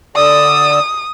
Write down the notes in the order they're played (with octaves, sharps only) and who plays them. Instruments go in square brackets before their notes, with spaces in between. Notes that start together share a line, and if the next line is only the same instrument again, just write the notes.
[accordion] D3 D5 E6 [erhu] D#6